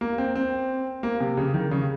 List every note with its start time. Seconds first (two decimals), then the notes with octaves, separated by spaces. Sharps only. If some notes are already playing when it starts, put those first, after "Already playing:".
0.01 A#3
0.18 C4
0.35 C4
1.03 A#3
1.20 C3
1.37 C#3
1.54 D#3
1.71 C#3